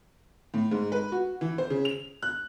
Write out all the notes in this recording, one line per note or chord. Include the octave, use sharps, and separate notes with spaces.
A2
G#2
B4
F#4
E3
C5
C#3
F7
F#6